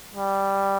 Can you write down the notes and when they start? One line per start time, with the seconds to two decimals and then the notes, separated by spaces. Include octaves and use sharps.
0.14 G3